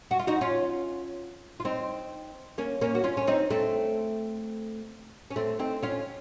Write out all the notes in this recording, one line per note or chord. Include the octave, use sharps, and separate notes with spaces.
F#4
F4
D#4 F#4
C#4 F4
F4
C4 D#4
A#3 C#4
A#3 C#4
F#4
C#4 F4
C#4
C4 D#4
A3 C4
C#4
A3 C4
C4 D#4
C#4 F4